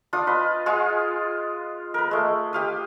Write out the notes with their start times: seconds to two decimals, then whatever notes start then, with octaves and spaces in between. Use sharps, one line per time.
0.13 D4 F4 D#6
0.27 B4 D#5
0.66 G#3 F4 G#4
1.94 A#4 B4
2.11 G#3 A3
2.53 G4 F5 D#6